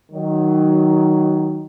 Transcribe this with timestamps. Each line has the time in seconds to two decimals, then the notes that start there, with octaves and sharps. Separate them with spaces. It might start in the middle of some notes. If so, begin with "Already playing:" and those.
0.12 D#3 F#3